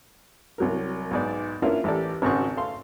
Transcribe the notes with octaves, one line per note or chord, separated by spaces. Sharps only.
C2 F#3 A#4
B1 G#2 D5
A#3 C#4 D4 E4 F4 A#4
A1 G4 A4 D5
G#1 G#2 C#3 C4 F#4 C#6
A3 A4 F5 C6